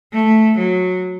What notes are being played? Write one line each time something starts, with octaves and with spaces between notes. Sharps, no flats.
A3
F#3